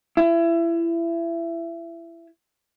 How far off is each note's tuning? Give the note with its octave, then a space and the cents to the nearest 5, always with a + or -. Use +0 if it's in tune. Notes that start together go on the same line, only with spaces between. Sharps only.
E4 +25